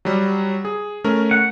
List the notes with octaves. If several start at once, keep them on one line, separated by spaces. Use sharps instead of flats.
F#3 G3
G#4
A3 C#4 A#4
F#5